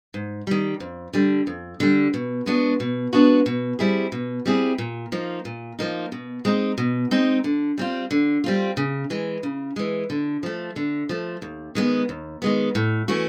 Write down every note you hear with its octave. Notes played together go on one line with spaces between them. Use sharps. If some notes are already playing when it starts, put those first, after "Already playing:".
G#2
D#3 G3
F2
D3 G3
F2
D3 G3
B2
G#3 B3 D4 F#4
B2
G#3 B3 D4 F#4
B2
G3 C4 E4 G#4
B2
G3 C4 E4 G#4
A#2
F3 A#3 D#4
A#2
F3 A#3 D#4
B2
G#3 C4 D#4
B2
G#3 C4 D#4
D3
G3 C4 F4
D3
G3 C4 F4
C#3
E3 G#3
C#3
E3 G#3
D3
F3 A3
D3
F3 A3
D#2
D#3 G#3 B3
D#2
D#3 G#3 B3
A2
E3 A3 C#4 F#4